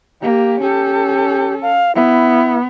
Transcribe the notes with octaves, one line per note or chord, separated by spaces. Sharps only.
A#3 G4
C#4 G4 A4
F5
B3 E4